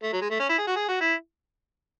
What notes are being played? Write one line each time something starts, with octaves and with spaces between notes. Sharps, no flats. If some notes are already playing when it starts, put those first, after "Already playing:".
A3
F#3
G#3
A3
C#4
E4
G#4
F#4
G#4
F#4
E4